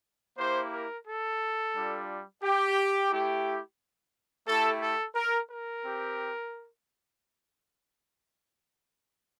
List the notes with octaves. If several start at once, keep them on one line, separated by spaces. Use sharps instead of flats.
A#3 E4 G4 C5
A#4
A4
G3 D4 F4
G4
A3 E4 G4
A3 E4 G4 A4
A4
A#4
A#4
C4 G4